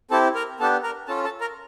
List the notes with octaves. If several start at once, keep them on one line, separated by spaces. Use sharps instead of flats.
C4 E4 G4 A4 A5
A#4 A#5
B3 D4 G4 A4 A5
A#4 A#5
C#4 F4 A4 A5
A4 A5
A#4 A#5